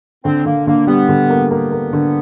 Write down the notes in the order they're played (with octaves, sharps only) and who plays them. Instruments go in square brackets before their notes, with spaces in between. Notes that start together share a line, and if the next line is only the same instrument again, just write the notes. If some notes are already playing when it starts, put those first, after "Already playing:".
[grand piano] D3 [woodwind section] C4
[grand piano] D3 [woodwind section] A#3
[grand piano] D3 [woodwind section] A#3
[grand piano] G3 [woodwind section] B3
[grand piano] D3
A#3
[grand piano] A#3 [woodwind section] B3
[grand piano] A#3
D3